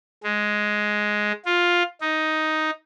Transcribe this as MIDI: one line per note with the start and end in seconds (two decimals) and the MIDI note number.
0.24 1.32 56
1.46 1.83 65
2.01 2.71 63